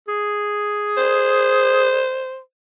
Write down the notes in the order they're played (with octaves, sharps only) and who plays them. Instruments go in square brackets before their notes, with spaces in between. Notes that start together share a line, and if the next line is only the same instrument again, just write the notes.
[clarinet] G#4
[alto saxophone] C5